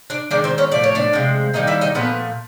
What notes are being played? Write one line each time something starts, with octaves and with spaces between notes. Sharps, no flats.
D4 D5
D#3 G#3 D4 D5
C4 C5
C#4 C#5
A2 F3 A3 D5
C#5
D4 D5
C3 F3 G#3
D#3 G3 A#3 D#4 D#5
E4 E5
D#4 D#5
A#2 F3 A3 B3 B4